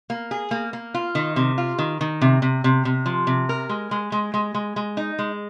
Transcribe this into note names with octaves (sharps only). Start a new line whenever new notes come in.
A#3
G#4
A#3
A#3
F4
D#3
C3
F4
D#3
D#3
C3
C3
C3
C3
F3
C3
A#4
G#3
G#3
G#3
G#3
G#3
G#3
D#4
G#3